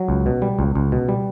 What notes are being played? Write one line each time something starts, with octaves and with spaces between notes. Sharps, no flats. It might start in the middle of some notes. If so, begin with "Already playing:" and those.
Already playing: F#3
C#2
B2
G3
C#2
C#2
B2
G3